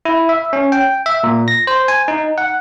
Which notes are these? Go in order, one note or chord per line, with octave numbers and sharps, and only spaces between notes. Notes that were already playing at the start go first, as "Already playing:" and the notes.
E4
E5
C#4
G5
E5
A#2
A#6
C5
G#5
D#4
F#5